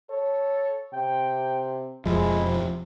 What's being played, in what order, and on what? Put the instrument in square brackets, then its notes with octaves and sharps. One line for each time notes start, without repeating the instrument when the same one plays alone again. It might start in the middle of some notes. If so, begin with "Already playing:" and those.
[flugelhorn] A4 [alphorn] C#5
[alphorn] C3 [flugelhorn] G5
[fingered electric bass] E1 F2 F3 [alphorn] G#3 [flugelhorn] E4
[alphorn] C3